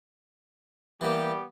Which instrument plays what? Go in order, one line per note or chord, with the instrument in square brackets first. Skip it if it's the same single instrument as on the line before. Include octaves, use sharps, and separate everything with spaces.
[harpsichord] E3 A#3 [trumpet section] G3 B3 G4